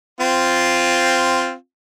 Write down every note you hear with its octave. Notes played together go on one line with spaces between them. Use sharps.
C4 F4